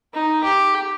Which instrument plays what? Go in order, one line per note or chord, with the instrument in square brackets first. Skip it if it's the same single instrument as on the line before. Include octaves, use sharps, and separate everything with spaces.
[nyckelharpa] D#4
G4